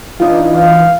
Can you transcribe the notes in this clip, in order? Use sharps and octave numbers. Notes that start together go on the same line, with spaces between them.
E3 D4 D#4 F4
F5